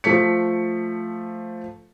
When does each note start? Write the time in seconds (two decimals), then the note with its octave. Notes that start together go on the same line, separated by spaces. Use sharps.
0.04 F3 A3 B6 C#7